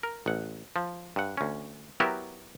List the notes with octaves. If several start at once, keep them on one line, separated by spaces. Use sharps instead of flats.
A#4
A1 F#5
F3
G2 F#5
D2 C#4
F#3 B3 E4 F#4 G4 A#4